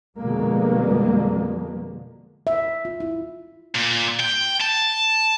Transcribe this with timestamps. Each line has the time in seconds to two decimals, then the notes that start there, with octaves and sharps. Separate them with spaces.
0.17 F2 B2 D3 G3 G#3 A#3
2.47 E5
2.85 F4
3.00 E4
3.75 A#2
4.20 G5
4.61 A5